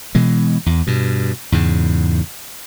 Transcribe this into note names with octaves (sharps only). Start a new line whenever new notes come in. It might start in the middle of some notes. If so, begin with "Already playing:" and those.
B2 E3 G#3
E2
G2 B2
E2 G#2 C#3